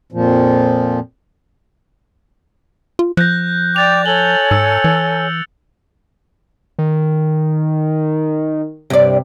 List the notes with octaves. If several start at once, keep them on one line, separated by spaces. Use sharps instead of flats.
F2 A#2 F3
F4
F3 F#6 G6 A#6
D5 G5 D6 G6 A6 F7
A4 C#5 G#5 F#7 G7
G#2 E6 C#7
E3
D#3
G2 C3 D5